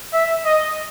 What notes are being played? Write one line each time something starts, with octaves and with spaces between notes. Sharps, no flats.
E5
D#5